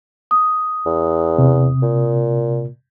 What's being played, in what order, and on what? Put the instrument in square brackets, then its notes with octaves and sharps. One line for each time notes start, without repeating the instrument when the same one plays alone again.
[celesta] D#6
[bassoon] E2
[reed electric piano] C3
[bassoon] A#2